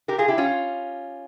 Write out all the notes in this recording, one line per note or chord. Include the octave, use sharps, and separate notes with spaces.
G4 A#4
F4 G#4
E4 G4
C#4 F4